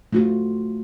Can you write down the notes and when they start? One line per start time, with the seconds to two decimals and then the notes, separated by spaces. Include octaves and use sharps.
0.13 A3 F4 F#4